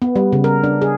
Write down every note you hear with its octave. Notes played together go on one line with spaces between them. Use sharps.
B3
G3
C#3
A#4
D4
G#4